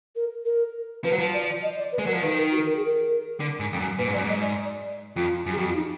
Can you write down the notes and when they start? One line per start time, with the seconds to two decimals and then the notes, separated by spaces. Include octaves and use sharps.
0.16 A#4
0.45 A#4
1.04 F3 B4
1.12 F#3
1.18 F3
1.34 D5
1.63 D#5
1.78 D5
1.92 B4
1.98 G#3
2.06 F#3 A#4
2.14 F3
2.22 D#3 B4
2.37 A#4
2.51 F#4
2.66 A#4
2.77 G#4
2.86 A#4
3.40 D3
3.59 G#2
3.73 F2
3.80 F#2
3.98 A#2 B4
4.07 G#2
4.13 F#2 D5
4.24 G#2 D#5
4.43 D5
5.16 F2 F4
5.46 F#2
5.52 G#4
5.57 F2 F#4
5.69 F4
5.76 D#4